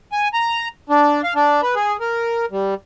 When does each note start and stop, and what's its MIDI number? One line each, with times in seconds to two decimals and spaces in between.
0.12 0.28 80
0.34 0.68 82
0.90 1.22 62
1.24 1.34 77
1.35 1.61 62
1.62 1.75 71
1.75 1.97 68
2.00 2.45 70
2.51 2.74 55